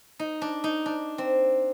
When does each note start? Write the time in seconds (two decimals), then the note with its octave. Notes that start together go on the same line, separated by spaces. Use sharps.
0.19 D#4
0.42 D4
0.64 D#4
0.86 D4
1.18 C4